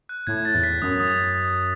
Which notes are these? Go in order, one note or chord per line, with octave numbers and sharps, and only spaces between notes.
F#6
A2 G#6
A6
E2
B6
F#2 D#6
D#6